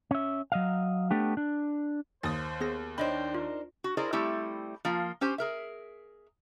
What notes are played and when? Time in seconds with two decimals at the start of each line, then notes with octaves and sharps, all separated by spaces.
0.11 C#4 E5
0.52 F#3 D#5 F5
1.11 A3 B3 D4 G4
1.37 D4
2.23 D#2 C5 D#6 A6
2.61 B3 G#4 A#6
2.98 D4 D#4 C5 C#5 D#5 G5 B5
3.34 F4 A#4
3.84 F#4
3.97 E4 G#4 A#4 C5 D5 D#5
4.13 G3 A3 C4 E4 G4
4.85 F3 A#3 F4
5.21 C#4 G4 C5 G#5
5.38 G#4 A#4 E5